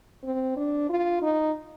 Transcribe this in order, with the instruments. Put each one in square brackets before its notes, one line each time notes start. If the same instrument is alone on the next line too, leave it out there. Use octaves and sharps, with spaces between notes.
[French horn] C4
D4
F4
D#4